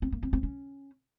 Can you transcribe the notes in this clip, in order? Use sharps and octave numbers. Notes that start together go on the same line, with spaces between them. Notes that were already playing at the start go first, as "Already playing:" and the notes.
C4
A#3
C4
C4
C#4